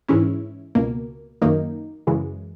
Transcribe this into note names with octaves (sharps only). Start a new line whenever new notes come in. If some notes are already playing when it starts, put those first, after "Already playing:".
G#2 E3 G#3 C#4 E4
C#2 B2 A#3
F#2 D#3 A#3 D#4
F#2 C#3 E3 G#3